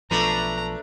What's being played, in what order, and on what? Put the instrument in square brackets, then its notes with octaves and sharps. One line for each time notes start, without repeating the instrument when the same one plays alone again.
[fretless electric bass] B1 B2 F3 [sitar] A3 D4 B4 [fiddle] A#5